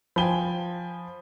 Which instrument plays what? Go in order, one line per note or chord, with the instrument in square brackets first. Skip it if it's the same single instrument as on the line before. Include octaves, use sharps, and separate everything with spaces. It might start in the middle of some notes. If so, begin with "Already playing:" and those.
[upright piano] F3 G7 [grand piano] G5 G#5 B5